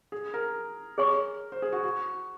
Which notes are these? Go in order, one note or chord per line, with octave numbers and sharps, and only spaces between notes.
G#4
A#4
G#4 C#5 G#5 C#6
C5
G#4
F#4
F#4